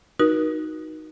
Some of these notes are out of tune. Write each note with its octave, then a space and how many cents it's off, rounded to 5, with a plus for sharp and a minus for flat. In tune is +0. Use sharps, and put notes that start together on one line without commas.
D#4 +5 F#4 +0 A#4 +45